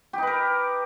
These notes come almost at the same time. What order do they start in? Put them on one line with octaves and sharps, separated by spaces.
G4 D#4 B4 A#4